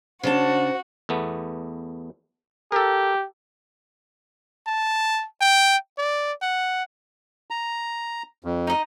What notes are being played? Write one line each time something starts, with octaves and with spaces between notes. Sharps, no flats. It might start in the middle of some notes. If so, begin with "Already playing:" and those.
C#3 D4 F#4 C5 A5
E2 A3 B3
G4 A4 A#4
A5
G5
D5
F#5
A#5
F2
D#4 D#5